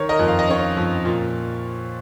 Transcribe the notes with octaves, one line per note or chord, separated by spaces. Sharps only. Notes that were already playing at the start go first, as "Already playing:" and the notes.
Already playing: D#3 C#5
A#4 D#5
F2
F5
D#5
C#4 C#5 F5
F2
A#2